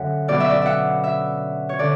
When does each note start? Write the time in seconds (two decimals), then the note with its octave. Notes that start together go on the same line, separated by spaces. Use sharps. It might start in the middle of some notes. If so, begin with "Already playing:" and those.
Already playing: F#2 D3 E5 F#5
0.28 B2 F#3 D5
0.40 E5
0.50 D5
0.62 E5 F#5
1.04 E5
1.69 C#5
1.79 D3 D5